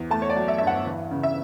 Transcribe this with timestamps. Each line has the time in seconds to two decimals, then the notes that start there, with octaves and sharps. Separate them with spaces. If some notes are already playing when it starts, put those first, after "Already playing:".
Already playing: E2
0.10 A3 A5
0.22 C#5
0.30 D5
0.36 F#3
0.48 E5
0.58 G2 E5
0.67 F#5
0.85 E3
1.11 C#3
1.23 E5